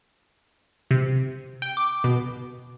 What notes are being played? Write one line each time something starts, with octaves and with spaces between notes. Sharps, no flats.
C3
G5
D6
B2